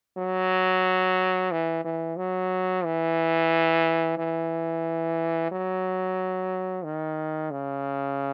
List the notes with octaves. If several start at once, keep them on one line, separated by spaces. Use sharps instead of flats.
F#3
E3
E3
F#3
E3
E3
F#3
D#3
C#3